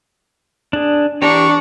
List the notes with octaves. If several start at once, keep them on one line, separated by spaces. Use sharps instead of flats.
D4 G#4
E3 D4 G4 A#5 C#6